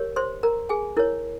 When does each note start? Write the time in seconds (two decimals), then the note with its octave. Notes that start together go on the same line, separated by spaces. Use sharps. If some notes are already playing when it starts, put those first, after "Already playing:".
Already playing: G4 A#4 C#5
0.16 C5 C6
0.43 A#4 A#5
0.69 G#4 G#5
0.97 E4 A#4 C#5